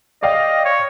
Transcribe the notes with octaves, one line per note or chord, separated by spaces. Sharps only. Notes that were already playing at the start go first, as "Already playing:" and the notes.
D5 D#5 F5 G5
C#5